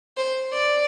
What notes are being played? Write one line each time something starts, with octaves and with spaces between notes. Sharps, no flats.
C5
D5